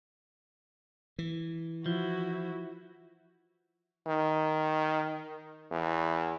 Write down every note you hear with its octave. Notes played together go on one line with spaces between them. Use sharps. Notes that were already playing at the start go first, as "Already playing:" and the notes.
E3
F3 E4 F#4
D#3
E2